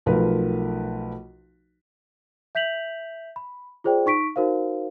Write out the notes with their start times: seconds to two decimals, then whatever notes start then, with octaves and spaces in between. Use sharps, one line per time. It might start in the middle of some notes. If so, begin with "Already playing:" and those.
0.06 B1 F3 A3 A#4 B4
2.55 E5 G6 B6 F7 F#7
3.36 B5
3.84 F4 G#4 C5 D5 G5
4.06 D#4 C#6 B6 D7
4.36 D#4 F#4 A#4 C5 F5